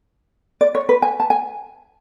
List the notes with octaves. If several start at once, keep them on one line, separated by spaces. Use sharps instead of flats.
D5
C#5
B4
G#5
A5
G#5